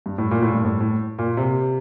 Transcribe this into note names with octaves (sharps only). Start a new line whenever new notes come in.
G2
A2
A#2
A2
G2
A2
A2
A#2
C3